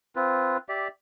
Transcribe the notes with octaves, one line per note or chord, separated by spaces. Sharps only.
C4 F4 B4
G4 D5 E5